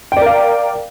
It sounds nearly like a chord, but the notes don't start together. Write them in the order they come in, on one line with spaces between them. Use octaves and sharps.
G5 D5 A#4 F5